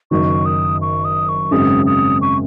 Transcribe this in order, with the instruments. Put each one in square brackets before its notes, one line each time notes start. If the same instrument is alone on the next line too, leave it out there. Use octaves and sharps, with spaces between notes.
[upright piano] F#1 F#2 D#3 F#3 [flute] C#6
[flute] D#6
C#6
D#6
C#6
[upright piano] G#1 F#2 C#3 G#3 C4 [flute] D#6
[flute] D#6
C#6